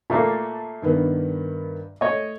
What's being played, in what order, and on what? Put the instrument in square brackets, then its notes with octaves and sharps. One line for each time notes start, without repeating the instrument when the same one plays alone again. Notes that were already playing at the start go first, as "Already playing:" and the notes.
[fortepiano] A#2 A3 A#3 [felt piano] A5
[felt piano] G2 D#3 B3
[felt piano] A3 [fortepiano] C#5 D#5